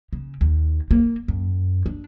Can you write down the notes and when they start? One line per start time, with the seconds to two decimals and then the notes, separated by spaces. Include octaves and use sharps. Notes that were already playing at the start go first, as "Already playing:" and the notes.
0.13 C#3
0.41 D#2
0.91 A#3
1.28 F#2
1.86 D4